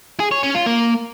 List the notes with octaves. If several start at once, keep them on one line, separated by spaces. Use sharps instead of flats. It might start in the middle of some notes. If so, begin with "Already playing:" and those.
G#4
C#5
C#4
F4
A#3